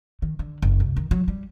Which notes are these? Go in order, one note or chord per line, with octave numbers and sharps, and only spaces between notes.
D#3
D3
F#1
C2
D#3
F#3
G3